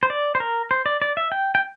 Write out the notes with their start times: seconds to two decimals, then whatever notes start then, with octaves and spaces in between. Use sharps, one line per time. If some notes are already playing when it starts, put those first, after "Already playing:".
0.03 C5
0.10 D5
0.35 C5
0.40 A#4
0.71 C5
0.86 D5
1.02 D5
1.17 E5
1.32 G5
1.55 G5